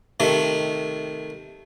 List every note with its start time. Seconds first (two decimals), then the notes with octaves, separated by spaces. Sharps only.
0.20 C3 D#3 A3